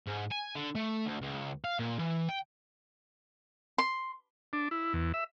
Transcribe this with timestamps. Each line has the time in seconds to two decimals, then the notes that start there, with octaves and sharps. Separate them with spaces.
0.07 G#2
0.31 G#5
0.55 D3
0.75 A3
1.06 D2
1.22 C#2
1.65 F5
1.79 A#2
1.99 E3
2.29 G5
3.78 C6
4.53 D4
4.71 E4
4.93 E2
5.14 E5